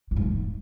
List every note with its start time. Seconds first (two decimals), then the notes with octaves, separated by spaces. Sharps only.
0.11 C3
0.16 G#2
0.22 E2